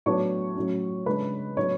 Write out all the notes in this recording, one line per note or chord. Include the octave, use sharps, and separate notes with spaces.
A2 F#3 B3 D4 C#5 C#6
A2 F#3 C#4
C#3 G#3 D4 B4 B5
A2 F#3 B3 D4 C#5 C#6